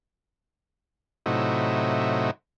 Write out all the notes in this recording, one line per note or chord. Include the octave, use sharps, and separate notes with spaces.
A2 C3 F#3 D#4 E4